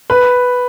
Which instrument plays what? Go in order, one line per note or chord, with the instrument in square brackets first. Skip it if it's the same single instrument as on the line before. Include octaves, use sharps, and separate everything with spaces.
[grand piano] B4